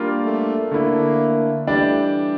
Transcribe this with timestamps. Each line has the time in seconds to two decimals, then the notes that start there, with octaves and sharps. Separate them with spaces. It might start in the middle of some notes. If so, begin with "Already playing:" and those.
Already playing: G3 A#3 D4 F4
0.23 A3
0.71 D3 A3 A#3 E4
1.67 E3 G3 A3 D4 G4 D5